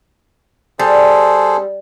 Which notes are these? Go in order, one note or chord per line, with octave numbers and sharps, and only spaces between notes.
G3 G#4 A4 C5